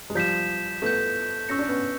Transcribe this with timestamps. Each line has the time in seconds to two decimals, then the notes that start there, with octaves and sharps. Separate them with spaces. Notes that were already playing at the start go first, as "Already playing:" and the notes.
0.10 G#3
0.15 F3 G3 G6 B6 E7
0.82 A3 B3 G6 B6 E7
1.49 C#4 C#6 E6 G6 A#6 C#7
1.59 D4
1.69 B3 C#4